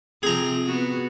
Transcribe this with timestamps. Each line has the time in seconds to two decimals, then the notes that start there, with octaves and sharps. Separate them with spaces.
0.23 C3 F3 C4 G#4 A#5
0.65 B3 F#4